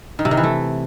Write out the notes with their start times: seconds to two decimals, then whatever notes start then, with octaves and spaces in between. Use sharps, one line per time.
0.19 D#3
0.25 C3
0.31 D#3
0.37 E3
0.44 A3